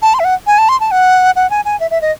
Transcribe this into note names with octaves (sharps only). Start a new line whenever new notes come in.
A5
C6
E5
F#5
G#5
A5
C6
A5
F#5
F#5
G#5
G#5
E5
E5
D#5